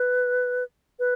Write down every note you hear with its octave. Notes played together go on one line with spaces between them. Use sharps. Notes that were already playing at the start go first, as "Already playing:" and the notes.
Already playing: B4
B4